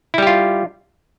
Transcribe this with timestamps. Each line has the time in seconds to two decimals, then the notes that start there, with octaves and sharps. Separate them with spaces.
0.14 E4
0.18 G3
0.22 G4
0.27 F4